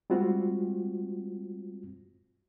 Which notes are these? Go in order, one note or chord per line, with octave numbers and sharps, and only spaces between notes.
G3 G#3 C4 F4 F#4